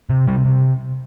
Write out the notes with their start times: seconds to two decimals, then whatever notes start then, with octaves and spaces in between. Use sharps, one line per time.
0.10 C3
0.28 C3 G3
0.45 C3